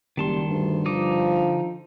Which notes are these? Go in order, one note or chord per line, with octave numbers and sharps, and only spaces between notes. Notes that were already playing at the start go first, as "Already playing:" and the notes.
F#1 D#3 G3 A5 C6
D2 G2
D3 F3 D#4 D6